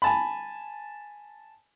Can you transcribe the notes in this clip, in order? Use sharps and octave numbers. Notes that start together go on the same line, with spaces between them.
G#5 A5 B5